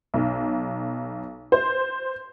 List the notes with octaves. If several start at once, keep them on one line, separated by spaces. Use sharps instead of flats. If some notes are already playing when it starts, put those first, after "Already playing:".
B1
C5